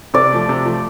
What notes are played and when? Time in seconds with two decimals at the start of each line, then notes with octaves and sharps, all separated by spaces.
0.14 C3 D5
0.32 F3 A3
0.49 C3
0.66 F3 A3